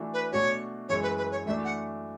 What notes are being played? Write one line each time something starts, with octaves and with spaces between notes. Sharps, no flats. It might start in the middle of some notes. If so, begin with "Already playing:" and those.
Already playing: E3 A3 D4 F#4
B4
B2 A3 D4 F#4 C#5
F#2 E3 G#3 C#5
B4
B4
C#5
E3 A3 D4 F#4 E5
F#5